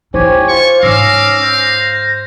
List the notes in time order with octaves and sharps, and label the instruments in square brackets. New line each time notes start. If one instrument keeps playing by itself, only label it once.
[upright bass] E4 [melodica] G4 C#5 G#5 [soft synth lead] C5
[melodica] F4 [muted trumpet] C#6
[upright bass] G#2 [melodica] C#4 D6 E6 [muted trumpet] F5 [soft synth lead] A#6
[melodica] C5